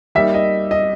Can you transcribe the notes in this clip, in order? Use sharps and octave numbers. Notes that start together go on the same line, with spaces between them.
G3 A#3 D#4 E5
D#5
D#5